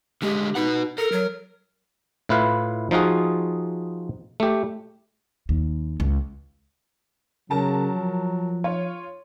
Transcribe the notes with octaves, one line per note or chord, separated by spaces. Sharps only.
D3 G#3 G4 D#5
D#4 F#4 B4 F#5
A4 A#4
F#3
A2 E4 F4 B4 F5
F3 D#4 F4 F#4 G#4
A3 G4
D#2
C#2
C#3 F#3 A#4 A5 A#5
F3
F4 C#5